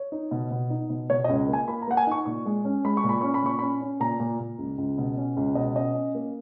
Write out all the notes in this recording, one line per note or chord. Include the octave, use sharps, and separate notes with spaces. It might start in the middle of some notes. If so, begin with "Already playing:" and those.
Already playing: C#5
D#4
B2
B2
D#4
B2
B2 C#5
D#5
C#2
A#3
G#5
A#3 B5
A#5
A#3 F#5
G#5
D#4 C#6
A#2 C#6
G#3
C#4
G#3 B5
C#6
A#2
B5
C#4 C#6
B5
A#2 C#6
C#4 B5
C#4
A#2 A#5
A#2
A#2
C#2
C#2
B2
C#4
C#2
B2 D#5
C#4 D#5
C#4
A#3